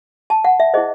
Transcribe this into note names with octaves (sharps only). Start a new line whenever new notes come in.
A5
F#5
E5
E4 G#4 C5 D#5